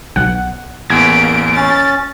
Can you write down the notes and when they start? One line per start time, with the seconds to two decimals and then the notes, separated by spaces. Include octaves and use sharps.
0.16 B1 F#5
0.90 A1 E2 A#3 G#6 B6 D7
1.55 C#4 A6